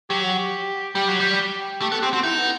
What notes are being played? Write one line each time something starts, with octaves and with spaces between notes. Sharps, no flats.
F#3 G4
F#4
G4
G3 G4
F#3
G3
A3 G4
B3 A4
C4 G4
C4 F#4
D#4 E4
B3